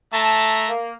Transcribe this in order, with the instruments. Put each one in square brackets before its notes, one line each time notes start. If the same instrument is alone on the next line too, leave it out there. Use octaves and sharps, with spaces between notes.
[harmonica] A3 A#5 [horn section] A5
[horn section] A#3